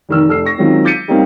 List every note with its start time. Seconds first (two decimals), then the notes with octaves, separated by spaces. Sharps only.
0.09 F1 D#3 E6
0.28 F1 A4 E6 C7
0.45 C#6 A#6
0.58 D#3 F#3 G#3 C4 C#4 F4
0.85 D6 G6 A6 B6 C#7 D#7
1.08 G3 A#3 C4 C#4 D#4 G4